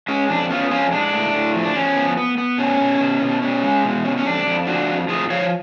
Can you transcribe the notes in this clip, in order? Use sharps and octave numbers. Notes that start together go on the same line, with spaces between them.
G#3 C#4
F2 D4
B3 C#4 F4
F2 C#4 F4
G#3 D4
A2
A2
F3
D4
F3 C#4
B3
B3
B3
B2 C#4
B2
B2
B2
C#4
G#3
B2
C#4
C#4
F2 D4
F2
F3 D4 F#4
F2
F2 F4 G#4
F3 C#5 F5